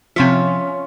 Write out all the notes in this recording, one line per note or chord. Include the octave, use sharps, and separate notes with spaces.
C3 F3 C#4 F4 E5